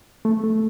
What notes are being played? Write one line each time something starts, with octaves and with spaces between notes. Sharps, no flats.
A3
A3